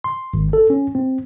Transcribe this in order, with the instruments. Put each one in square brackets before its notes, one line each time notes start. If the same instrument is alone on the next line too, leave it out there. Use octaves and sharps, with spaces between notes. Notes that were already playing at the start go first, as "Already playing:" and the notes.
[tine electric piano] C6
G#1
A4
C#4
C4